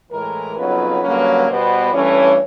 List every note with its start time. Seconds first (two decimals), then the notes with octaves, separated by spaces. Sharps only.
0.11 A2 E3 G#3 A#4
0.56 F2 C#3 F#3 B3 D#4 B4
1.01 G2 D3 F#3 A#3 C#4
1.46 B2 G3 B3 C5
1.91 G2 E3 A3 C#4 C#5